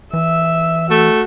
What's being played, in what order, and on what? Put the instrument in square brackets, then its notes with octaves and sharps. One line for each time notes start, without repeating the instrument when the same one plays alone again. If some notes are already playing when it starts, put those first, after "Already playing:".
[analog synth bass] E3 [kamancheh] E5 E6
[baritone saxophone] A3 [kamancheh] F#4